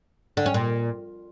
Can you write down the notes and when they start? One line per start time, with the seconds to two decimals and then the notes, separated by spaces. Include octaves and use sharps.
0.37 D3
0.46 C#4
0.54 A#2